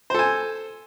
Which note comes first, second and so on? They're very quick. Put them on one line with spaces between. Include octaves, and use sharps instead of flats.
C5 A4 G#5